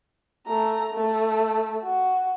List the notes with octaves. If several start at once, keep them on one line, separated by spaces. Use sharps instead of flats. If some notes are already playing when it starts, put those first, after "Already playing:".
A3 A#5
A3
F#4